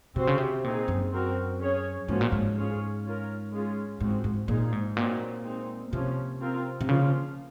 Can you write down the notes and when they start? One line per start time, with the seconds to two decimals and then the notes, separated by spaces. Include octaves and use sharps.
0.16 C3 C4 F#4 C5
0.27 C#3
0.38 C3
0.64 A#2 C4 D#4 G#4
0.88 F#2
1.12 C4 F#4 A#4
1.60 C#4 G#4 C#5
2.08 G#2 F3 A#3 C#4 F#4
2.21 A#2
2.32 G#2
2.57 C#4 F4 G#4 C#5
3.04 C#4 F4 A#4
3.52 G#3 C#4 F4 G#4
4.01 G#2 F3 C4 F#4
4.24 G#2
4.48 A#2 F3 G#3 D#4 G#4
4.72 G#2
4.96 A#2 F#3 C4 D#4 F#4
5.44 G#3 C4 D#4
5.92 C3 F3 A#3 C#4
6.41 C4 F4 A#4
6.81 C3
6.89 C#3 F3 A#3 F4